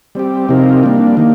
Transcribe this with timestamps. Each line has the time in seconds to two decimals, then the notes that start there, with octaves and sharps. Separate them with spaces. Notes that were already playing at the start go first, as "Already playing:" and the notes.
0.15 G3 C4 G4
0.49 C3 F3 C4 D#4 A#4
0.83 G3 A#3 D4
1.17 D#3 A#3